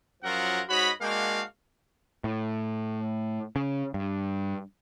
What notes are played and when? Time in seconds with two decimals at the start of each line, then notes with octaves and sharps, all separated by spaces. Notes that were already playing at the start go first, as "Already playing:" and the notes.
0.23 F#2 F3 F#3 F4 A#4 F#5
0.69 G#2 F#4 C#5 D#5 B5
1.01 G#3 A#3 D4 F#4 F5 G5
2.24 A2
3.56 C#3
3.94 G2